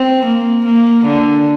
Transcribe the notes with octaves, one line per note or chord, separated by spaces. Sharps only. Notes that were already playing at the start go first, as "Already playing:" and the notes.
Already playing: C4
A#3
A#3
D3